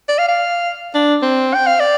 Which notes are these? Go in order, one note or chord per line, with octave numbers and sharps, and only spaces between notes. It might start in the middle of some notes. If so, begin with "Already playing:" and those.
D5
F5
F5
D4
C4
G5
F5
D5